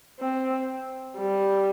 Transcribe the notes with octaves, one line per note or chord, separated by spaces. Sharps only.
C4
G3